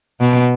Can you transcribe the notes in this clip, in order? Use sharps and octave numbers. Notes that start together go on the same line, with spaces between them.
B2